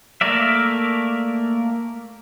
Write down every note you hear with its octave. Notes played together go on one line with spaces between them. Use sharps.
A3 A#3 A#4 D5 E5